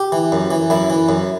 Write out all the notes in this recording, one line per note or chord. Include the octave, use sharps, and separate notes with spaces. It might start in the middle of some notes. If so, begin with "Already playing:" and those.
Already playing: G4
E3
F#2
E3
F#2 E4
E3
F#2